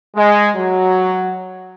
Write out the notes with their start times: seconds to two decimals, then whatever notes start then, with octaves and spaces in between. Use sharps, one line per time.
0.15 G#3
0.55 F#3